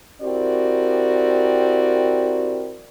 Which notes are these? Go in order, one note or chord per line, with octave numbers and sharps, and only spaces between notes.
C4 E4 F#4 G4 A#4 D5